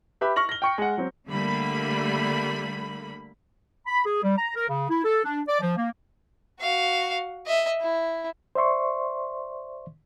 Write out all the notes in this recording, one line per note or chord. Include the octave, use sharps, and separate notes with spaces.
G4 B4 E5 B5
C#6 F6 A#6 F#7
A#6 G7
G5 C#6 C#7
G#3 F#5
F#3 C4
D3 G3 A3 A#3 B5
B5
G#4
G3
A#5
A#4
C#3
E4
A4
D4
D5
F3
A#3
F#4 F5
D#5 E5
E4
C5 D5 E5 C6 C#6